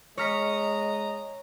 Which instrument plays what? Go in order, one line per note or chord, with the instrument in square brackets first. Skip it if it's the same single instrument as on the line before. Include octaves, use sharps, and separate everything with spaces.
[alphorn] G#3 [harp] C#5 F6 B6 [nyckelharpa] D#5 A#5